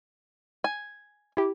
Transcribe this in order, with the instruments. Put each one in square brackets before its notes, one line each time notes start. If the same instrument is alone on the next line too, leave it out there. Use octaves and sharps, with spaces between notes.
[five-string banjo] G#5
[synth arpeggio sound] E4 G4